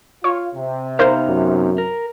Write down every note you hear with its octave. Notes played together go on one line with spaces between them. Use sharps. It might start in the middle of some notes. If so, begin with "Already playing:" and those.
F4 C#5
C3
B3 D#4 A#4 C5 F5
F#2
A#4